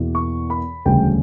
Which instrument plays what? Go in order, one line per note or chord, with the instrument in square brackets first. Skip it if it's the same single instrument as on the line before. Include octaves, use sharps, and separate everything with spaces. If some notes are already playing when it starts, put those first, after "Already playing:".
Already playing: [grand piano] E2 B2 A#3 E4
C#6
B5
E1 D2 C#3 G3 G5